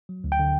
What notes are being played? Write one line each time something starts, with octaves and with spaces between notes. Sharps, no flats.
F#3
D2
G5
D3